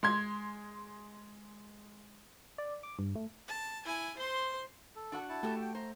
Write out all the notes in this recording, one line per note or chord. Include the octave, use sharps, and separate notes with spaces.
G#3 C6 G#6
D5
D6
G2
A3
A5
E4 G#5
C5 C6
A4
D4 F#4 F#5
E4 A5
A3 F#4 G4 A4
G5
C5 A#5